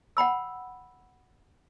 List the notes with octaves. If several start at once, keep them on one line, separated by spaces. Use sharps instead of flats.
F#5 G5 B5 E6